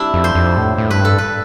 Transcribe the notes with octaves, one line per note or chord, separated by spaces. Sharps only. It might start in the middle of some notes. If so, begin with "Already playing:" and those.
Already playing: G3 C4 D4 E4
F2
C5
F2
A2
A2
G2 B4
A4
B4